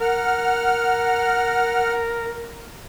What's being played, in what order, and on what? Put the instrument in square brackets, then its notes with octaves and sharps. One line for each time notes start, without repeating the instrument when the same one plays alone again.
[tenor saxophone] A#4 [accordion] F#5 F6